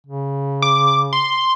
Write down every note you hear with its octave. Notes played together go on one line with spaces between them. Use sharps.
C#3
D6
C6